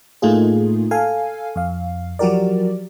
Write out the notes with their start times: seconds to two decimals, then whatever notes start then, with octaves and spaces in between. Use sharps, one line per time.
0.22 A2 A3 A#3 D#4 F4 G#4
0.91 A4 F5 G#5
1.56 F2 F5
2.19 F3 F#3 F#4 G4 A#4 D5